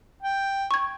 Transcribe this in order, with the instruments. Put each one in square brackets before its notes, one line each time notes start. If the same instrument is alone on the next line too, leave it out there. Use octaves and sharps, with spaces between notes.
[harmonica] G5
[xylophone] C#6 G#6